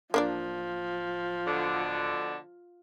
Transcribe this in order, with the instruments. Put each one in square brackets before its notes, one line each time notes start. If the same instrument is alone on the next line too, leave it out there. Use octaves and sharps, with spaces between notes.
[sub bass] D1 [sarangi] F3 [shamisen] A#3 D4 D5
[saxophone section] B2 D3